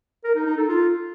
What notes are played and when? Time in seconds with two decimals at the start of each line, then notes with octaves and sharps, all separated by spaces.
0.24 A#4
0.35 D#4
0.46 D#4
0.57 A4
0.68 F4